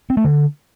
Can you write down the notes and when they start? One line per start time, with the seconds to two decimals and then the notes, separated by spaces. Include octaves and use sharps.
0.10 C4
0.17 A3
0.24 D3